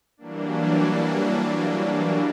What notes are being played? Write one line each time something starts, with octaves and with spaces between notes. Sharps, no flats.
E3 F#3 G3 A#3 D4